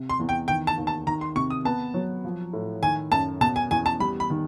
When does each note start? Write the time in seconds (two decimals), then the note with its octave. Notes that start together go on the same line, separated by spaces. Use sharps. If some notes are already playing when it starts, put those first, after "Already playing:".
Already playing: C3
0.10 C6
0.19 E2
0.29 G5
0.48 D#3 G5
0.67 A5
0.77 D#2
0.87 A5
1.07 D#3 A#5
1.21 C6
1.35 C3 C#6
1.50 D#6
1.65 B3 A5
1.94 F#3
2.25 F3
2.53 A2
2.82 D#3 G#5
3.11 F#2 A5
3.41 B2 A5
3.56 G#5
3.71 E2 G#5
3.86 A5
4.00 G3 B5
4.20 B5
4.30 D#3